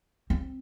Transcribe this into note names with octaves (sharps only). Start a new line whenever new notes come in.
C4